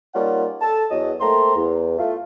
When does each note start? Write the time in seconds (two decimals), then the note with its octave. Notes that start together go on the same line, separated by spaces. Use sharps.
0.14 G3 A#3 C#4 D#4 F4 F#5
0.61 A4 A5
0.91 E2 F#3 D#5
1.20 A3 A#3 C4 A#5 C6
1.55 E2
1.98 A3 F4